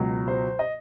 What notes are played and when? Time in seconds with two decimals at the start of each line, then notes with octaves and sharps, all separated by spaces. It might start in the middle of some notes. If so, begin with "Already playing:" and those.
Already playing: C#2 B2 F#3
0.28 C5
0.59 D#5